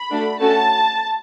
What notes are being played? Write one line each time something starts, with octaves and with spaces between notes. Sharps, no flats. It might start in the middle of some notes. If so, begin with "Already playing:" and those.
Already playing: B5
A3 D4 F#4 A4
A3 C#4 F#4 A4 A5